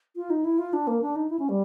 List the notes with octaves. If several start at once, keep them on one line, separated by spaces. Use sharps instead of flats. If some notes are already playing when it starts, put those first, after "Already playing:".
F4
D#4
E4
F4
D4
A#3
D4
D#4
E4
C#4
G3